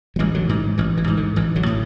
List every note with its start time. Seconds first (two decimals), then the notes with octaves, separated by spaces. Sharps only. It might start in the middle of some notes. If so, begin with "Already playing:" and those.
0.16 F#3
0.19 A1 E3 G#3
0.35 D3 F#3
0.49 G#2 E3
0.78 A1 E3
0.97 E3
1.07 G#2
1.17 D3
1.36 A1 E3
1.56 D3 F#3
1.66 A2